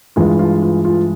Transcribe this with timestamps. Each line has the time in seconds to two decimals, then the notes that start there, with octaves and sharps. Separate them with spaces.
0.16 G2 E3 G#3 F4
0.39 F4
0.62 F4
0.85 F4